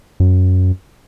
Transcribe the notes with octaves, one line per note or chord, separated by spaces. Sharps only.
F#2